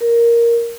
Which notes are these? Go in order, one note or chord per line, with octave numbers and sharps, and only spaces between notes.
A#4